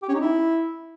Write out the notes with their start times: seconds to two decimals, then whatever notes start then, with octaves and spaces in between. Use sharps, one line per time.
0.02 G4
0.09 C#4
0.15 D#4
0.21 E4